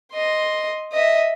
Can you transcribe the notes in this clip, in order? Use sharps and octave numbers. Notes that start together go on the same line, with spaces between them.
D#5 C6
D#5 E5